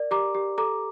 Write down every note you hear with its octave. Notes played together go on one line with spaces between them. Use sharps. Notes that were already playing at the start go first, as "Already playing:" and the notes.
Already playing: A#4 D5
G4 A#5 D6
G4
A4 A#5 D6